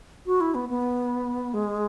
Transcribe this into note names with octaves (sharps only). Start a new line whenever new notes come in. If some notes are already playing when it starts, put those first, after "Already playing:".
F#4
E4
B3
B3
G#3